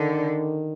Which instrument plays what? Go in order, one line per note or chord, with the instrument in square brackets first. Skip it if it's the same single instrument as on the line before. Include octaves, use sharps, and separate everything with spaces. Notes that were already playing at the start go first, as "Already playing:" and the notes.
Already playing: [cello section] D3 [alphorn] D#3